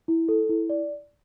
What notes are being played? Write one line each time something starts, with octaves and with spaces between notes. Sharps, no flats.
E4
A4
E4
D5